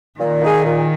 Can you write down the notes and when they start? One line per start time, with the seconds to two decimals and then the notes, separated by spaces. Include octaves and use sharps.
0.19 A#2 D#3
0.42 A#3 D#4 G#4
0.64 A#2